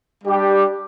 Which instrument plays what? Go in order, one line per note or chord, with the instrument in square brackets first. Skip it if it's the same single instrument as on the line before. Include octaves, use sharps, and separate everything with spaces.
[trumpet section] G3 D4 G4 D5